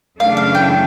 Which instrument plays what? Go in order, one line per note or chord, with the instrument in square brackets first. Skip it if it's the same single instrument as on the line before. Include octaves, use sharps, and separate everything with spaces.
[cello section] F#2 C#3 E3 A3 D4 [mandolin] F5
[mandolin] F5
G5